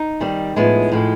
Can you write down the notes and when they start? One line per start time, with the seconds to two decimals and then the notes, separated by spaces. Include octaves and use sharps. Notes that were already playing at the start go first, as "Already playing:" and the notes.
Already playing: D#4
0.20 D#3 G3 C4
0.56 A2 F3 G#3 B3
0.92 A2 F3 G#3